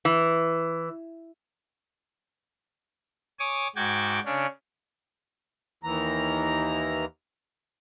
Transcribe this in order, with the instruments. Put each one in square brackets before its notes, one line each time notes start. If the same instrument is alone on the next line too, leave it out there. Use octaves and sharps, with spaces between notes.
[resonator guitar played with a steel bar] E3
[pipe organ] C#5 G#5 D6 D#6
G#2 F#4 G5 D6 G#6
C#3 C#4 D4
[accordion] D#2 E3 A#5